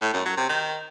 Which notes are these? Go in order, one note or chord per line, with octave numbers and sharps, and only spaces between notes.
A2
F#2
F#3
C3
D#3